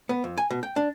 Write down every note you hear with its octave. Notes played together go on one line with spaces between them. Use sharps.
B3
F2
G#5
B2
G5
D4